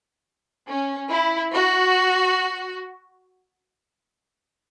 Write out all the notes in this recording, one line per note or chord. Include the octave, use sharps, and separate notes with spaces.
C#4
E4
F#4